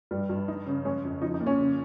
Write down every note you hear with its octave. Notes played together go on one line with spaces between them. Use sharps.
G2 G3
G2
D#4
C#3
G#3 C#4
F2
F3 D#4
D#4
A#2
C#4
C#3